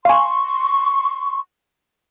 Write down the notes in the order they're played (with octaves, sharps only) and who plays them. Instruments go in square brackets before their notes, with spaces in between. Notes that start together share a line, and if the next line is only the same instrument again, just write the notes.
[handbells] F5 G#5 [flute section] C6 C#6